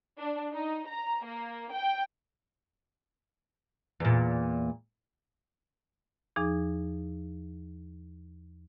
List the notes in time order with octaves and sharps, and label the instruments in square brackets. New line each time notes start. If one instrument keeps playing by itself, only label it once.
[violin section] D4
D#4
A#5
A#3
G5
[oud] E2 A#2
[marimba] E2 F3 D#4 G#4 D6